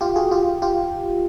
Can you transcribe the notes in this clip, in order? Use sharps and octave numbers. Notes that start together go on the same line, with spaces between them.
F4 G4
F#4 G#4
F4 G4
F4 G4